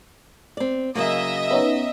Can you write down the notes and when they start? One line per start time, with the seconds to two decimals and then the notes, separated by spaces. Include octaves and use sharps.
0.57 C4 D5
0.95 C#3 F#3 A#3 D#5 E5
1.51 B3 C#4 D#4